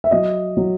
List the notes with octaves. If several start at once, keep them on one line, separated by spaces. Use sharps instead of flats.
E5
F#3 D#5
F#3